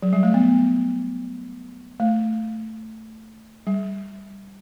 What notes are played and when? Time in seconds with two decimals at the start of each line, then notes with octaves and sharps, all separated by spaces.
0.02 F#3
0.13 G3
0.23 A3
0.34 B3
2.00 A3
3.67 G3